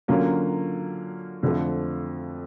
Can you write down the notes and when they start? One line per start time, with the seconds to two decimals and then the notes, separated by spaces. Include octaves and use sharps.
0.08 D3 F#3 A#3 C#4 F4
1.43 F2 D3 F3 A3